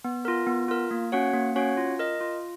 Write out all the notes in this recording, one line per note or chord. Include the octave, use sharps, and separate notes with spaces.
B3
F4 A#4
B3
F4 A#4
A#3
C#4 F#4 C#5 F#5
A#3
C#4 F#4 C#5 F#5
F4
A#4 D#5
F4